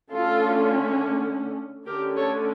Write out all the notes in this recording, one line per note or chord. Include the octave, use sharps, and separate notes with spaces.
D3 A3 C#4 F4 A4
D3 A3 C#4 G4 A#4
A4 C#5